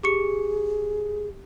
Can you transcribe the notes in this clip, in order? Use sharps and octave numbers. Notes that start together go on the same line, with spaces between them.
G4 G#4 C#6 C#7